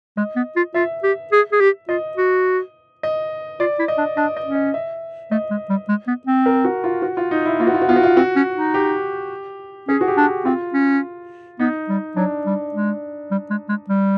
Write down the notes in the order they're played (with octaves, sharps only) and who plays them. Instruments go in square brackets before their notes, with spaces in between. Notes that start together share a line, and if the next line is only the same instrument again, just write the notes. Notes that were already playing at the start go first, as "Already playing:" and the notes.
[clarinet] G#3 [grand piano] D#5
[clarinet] B3
F4
[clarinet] F4 [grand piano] E5
[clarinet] G4
G#4
G#4
G4
[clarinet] F4 [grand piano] D#5
[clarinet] F#4
[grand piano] D#5
[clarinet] F4 [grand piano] D5
[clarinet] E4
[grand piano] D#5
[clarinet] D4
[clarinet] D4 [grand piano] D#5
[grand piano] D#5
[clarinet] C#4
[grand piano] D#5
E5
[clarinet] A3 [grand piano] D#5
[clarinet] G#3
G3
G#3
B3
C4
[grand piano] A#4
F#4
F4
F#4
F4
D#4
E4
[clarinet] A#3 [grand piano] F4
[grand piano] F#4
F4
F#4
[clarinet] B3 [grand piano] F4
[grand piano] F#4
F4
[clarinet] C4 [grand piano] F#4
[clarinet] C#4
D#4
[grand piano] G4
[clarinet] C#4 [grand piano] G#4
[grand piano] F#4
G4
[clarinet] D4
[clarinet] C4 [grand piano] F4
[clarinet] C#4
[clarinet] B3 [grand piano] D#4
[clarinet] G3
[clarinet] F#3 [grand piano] D4
[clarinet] G3
G#3
G3
G#3
G#3
G3